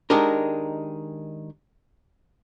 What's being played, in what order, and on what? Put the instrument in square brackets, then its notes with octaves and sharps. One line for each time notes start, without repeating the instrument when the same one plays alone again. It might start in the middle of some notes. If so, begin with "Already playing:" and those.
[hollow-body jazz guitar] D#3 G#3 D4 D#4 G4 A#4